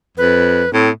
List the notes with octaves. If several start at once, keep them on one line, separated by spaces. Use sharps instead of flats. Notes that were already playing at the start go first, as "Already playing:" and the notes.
F2 B4
A2 C4